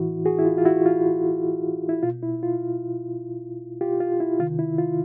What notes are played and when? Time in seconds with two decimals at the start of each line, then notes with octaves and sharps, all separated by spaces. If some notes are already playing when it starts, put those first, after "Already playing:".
Already playing: A2 E3 E4 F#4
0.26 F#4 G#4
0.39 E4
0.45 F4
0.58 F4
0.65 E4 F#4
0.86 F4
1.89 E4
2.03 B2 F4
2.23 E4
2.43 F4
3.81 F4 G4
4.00 F4
4.20 E4
4.39 C3 D#3 F4
4.59 E4
4.78 F4